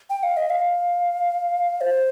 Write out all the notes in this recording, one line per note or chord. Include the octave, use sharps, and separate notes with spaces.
G5
F5
D#5
F5
C5